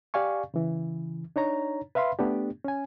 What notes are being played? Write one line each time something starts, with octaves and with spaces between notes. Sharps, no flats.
G4 D5 F5 G#5 C#6
C#3 E3
D4 D#4 C#5 A#5
B4 E5 F5 B5 C6
A3 B3 D4 G4
C#4 G#5